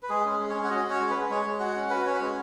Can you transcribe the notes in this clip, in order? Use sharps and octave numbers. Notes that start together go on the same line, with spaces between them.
B4
G#3 G#4
C#4 G#4
G#3
C#5
C#4
F#5
F#4 D#5
C#4
C#5
G#3
B4
G#3
G#3 C#5
G#3
F#4 F#5
C#4
F#4 B4
C#4 C#5
B4
G#3 C#5